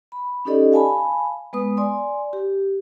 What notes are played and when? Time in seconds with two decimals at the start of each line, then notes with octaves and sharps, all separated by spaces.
0.12 B5
0.45 C#4 D#4 G4 A4 D5 D#5
0.72 F5 G#5 A5 B5
1.53 G#3 B3 B4 D#6
1.77 D5 G#5 C6
2.33 G4